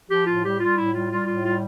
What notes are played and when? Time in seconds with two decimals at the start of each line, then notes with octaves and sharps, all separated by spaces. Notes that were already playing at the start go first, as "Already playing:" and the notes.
0.10 F3 G4
0.27 A2 F4
0.44 G3 G4
0.60 G3 F4
0.77 A2 E4
0.94 G3 F4
1.11 G3 F4
1.27 A2 F4
1.44 G3 F4